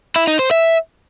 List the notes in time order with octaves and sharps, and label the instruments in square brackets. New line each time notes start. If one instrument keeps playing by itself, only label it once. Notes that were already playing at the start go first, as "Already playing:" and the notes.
[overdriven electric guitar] E4
D#4
C5
E5